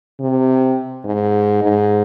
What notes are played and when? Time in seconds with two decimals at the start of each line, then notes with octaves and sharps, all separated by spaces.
0.20 C3
1.05 G#2
1.63 G#2